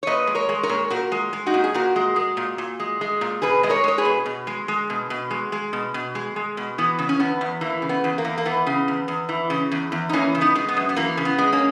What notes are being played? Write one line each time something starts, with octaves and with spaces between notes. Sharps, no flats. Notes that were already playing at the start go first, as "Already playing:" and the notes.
C#5
A#2 B4 D#5
G#3
A#4 C#5
G#3
A#4 C#5
A#2
A#2 F#4 A#4
G#3
G#3
D#4 F#4
A#2
G#4
A#2 F#4 A#4
G#3
G#3
A#2
A#2
G#3
G#3
A#2
B2 G#4 B4
G#3 D#5
A#4 C#5
G#3 C#5
G#4 B4
B2
B2
G#3
G#3
B2
B2
G#3
G#3
B2
B2
G#3
G#3
B2
E3 B3
C#3
C#4
E2 B3
E2
E3 A#3
C#3
B3
E2
A#3
E2
A#3
E3 B3
C#3
E2
E2
E3
C#3
E2
E2
D#4
E3 A#3 C#4
C#3
B3 D#4
G#3
B3
F#2
B3
E3 A#3
C#3
B3
G#3
A#3 C#4